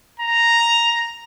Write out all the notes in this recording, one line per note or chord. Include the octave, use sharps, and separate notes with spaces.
A#5